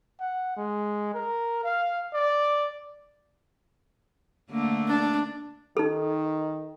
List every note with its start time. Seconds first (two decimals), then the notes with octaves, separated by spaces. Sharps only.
0.20 F#5
0.57 G#3
1.14 A#4
1.64 F5
2.13 D5
4.50 D3 A3 A#3
4.88 D4
5.77 D#3 D#4 A4